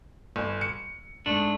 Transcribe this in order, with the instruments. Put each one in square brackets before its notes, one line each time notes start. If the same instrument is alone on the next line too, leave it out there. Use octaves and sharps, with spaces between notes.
[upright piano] G1
C#7
[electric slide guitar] G#2 A3 D4